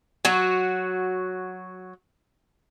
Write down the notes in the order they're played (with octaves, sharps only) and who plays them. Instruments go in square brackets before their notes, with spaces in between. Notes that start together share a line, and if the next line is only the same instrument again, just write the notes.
[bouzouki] F#3 F#4